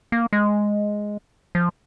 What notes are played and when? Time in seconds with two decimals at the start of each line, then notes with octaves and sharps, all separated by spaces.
0.12 A#3
0.33 G#3
1.55 F3